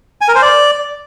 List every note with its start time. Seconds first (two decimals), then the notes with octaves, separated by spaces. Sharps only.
0.21 G#5
0.28 A#4
0.35 C5
0.42 D5